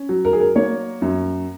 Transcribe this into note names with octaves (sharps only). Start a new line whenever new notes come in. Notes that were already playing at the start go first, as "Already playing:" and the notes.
Already playing: C#4
F#3
A#4
G#4
A#4
A#3 C#5
F#2